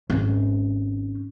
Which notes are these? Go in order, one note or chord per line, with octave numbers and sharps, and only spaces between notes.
G#1 C#4